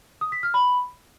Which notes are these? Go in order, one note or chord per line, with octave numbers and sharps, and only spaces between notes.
D#6
B6
F6
B5